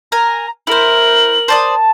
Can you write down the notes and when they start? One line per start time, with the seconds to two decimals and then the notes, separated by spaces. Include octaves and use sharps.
0.12 A#4 G#5 A#5
0.67 E4 A#4 C5 F#7
1.48 C5 D5 A5 D#6